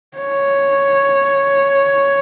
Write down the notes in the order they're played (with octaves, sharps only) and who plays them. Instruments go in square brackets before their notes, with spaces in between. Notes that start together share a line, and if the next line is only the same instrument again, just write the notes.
[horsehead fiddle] C#5